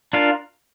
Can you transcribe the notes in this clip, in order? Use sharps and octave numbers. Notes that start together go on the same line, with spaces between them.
D4 F4 A#4